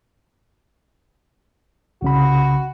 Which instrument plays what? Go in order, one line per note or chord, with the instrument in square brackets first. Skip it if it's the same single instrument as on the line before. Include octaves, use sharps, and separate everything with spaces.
[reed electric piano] C2 C#3 B5 [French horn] F#4